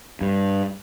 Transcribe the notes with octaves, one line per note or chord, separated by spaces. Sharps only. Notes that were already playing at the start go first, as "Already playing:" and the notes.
G2